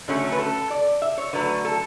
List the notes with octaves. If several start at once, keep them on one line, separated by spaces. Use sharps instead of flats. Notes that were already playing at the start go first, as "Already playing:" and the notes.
D3 F#3 A3 C#4
C#4
B4
A4
D5
E5
C#5
D3 F#3 A3 B4
A4